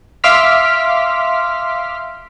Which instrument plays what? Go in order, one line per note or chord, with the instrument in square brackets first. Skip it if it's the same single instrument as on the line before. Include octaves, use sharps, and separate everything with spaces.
[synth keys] E5 F5 C6 D6 F6 B6